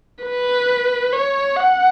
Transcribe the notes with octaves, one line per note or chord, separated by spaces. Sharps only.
B4
C#5
F#5